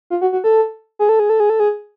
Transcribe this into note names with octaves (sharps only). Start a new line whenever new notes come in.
F4
F#4
F#4
A4
G#4
A4
G#4
A4
G#4
A4
G#4